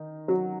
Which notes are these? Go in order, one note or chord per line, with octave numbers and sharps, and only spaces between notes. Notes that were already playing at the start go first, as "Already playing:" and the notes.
Already playing: D#3 D#4
F#3 F#4